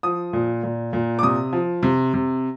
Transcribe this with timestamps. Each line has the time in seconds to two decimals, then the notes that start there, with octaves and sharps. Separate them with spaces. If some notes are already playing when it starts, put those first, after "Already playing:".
0.03 F3 D#6
0.33 A#2
0.63 A#2
0.93 A#2
1.19 D6
1.23 C3 D#6
1.53 F3
1.83 C3
2.14 C3